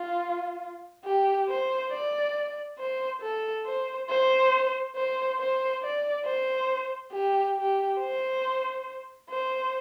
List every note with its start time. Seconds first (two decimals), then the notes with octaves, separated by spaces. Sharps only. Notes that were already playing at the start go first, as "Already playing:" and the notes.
Already playing: F4
1.05 G4
1.49 C5
1.92 D5
2.79 C5
3.22 A4
3.66 C5
4.09 C5
4.95 C5
5.39 C5
5.83 D5
6.25 C5
7.13 G4
7.57 G4
8.00 C5
9.30 C5